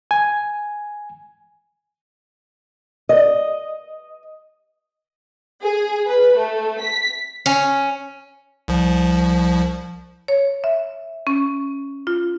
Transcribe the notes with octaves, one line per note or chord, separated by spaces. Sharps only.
G#5
D#5
G#4
B4
A3
B6
C#4
C2 F3
C#5
E5
C#4
F4